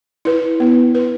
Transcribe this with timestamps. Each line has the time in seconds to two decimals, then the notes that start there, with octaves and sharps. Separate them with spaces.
0.25 E4 B4
0.60 B3
0.95 E4 B4